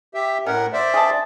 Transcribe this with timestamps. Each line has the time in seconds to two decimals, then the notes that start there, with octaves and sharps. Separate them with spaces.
0.14 G4 E5
0.46 A2 C#4 A#4 F#5
0.73 C5 D5 E5
0.94 G#4 A5